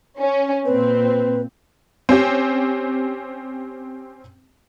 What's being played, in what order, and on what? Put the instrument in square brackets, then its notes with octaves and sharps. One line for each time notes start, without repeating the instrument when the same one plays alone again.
[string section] C#4
[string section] A#2 C4 [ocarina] B4
[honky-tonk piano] C4 C#4 G4